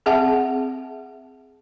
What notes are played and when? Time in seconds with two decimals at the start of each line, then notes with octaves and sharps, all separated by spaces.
0.06 C4 G#4 E5 F#5 A5